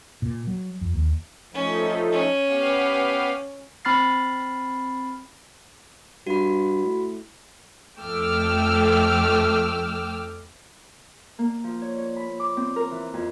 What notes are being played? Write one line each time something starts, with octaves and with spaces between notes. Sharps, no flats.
A#2
F#3
F2
D#2
F3 A3 C#4 D#4
C#4
B3 G4 F5
C4 B5 F6 A6 C7
G2 F#4 B5
A2
F2 A3 G5 D6 E6 F6
A#3
F3
C#5
C#5
B5
D6
C4
A#4
E3
F2